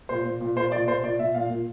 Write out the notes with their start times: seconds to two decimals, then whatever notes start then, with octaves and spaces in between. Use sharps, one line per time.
0.09 A#2 C5
0.25 A#2
0.41 A#2
0.56 A#2 C5
0.72 A#2 D5
0.88 A#2 C5
1.04 A#2 D5
1.19 A#2 E5
1.34 A#2 F5
1.50 A#2